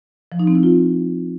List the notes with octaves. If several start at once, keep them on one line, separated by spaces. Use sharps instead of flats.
F3
D#4
C4
E4
F4